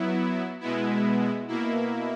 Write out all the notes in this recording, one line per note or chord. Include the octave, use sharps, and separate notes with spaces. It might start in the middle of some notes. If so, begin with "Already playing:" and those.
Already playing: F#3 B3 E4
B2 G#3 B3 E4
B2 A#3 E4